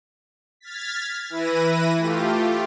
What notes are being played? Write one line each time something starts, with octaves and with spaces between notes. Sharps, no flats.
F6 G#6 A6 B6
E3 E4 B4 A#6 D#7
A3 F4 G4